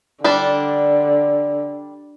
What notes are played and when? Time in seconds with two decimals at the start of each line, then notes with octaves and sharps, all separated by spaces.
0.24 D3 G3 D4 D5